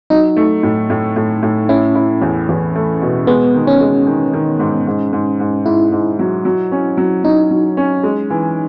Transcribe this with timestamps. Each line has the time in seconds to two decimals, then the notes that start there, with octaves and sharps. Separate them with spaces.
0.10 F#3 D#4
0.37 A3
0.63 A2
0.90 A2
1.16 A2
1.42 A2
1.69 C#4 E4
1.95 E4
2.22 E2
2.49 E2
2.75 A3
3.02 B2
3.27 G#3 B3
3.54 D#3
3.67 C#4
3.81 G#3
4.06 D#3
4.33 D#3
4.59 G#2
4.87 G#2
5.13 G#2
5.40 G#2
5.66 G#2 E4
5.92 G#2
6.19 F#3
6.45 F#3
6.72 C#4
6.97 F#3
7.24 F#3 D#4
7.50 F#3
7.77 C#4
8.03 G#3
8.30 E3